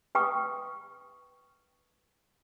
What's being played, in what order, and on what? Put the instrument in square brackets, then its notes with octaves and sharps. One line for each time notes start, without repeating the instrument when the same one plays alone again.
[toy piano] B4 G5 C#6 D#6